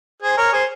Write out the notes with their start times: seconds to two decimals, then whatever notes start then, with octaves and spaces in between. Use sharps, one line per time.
0.22 G#4 C5
0.37 A#4 C#5
0.52 G#4 C5